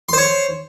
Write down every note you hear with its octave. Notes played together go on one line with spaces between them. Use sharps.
C5 C#5 C6